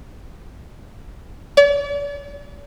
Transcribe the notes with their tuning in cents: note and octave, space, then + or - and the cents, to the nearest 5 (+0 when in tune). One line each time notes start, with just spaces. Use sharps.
D5 -45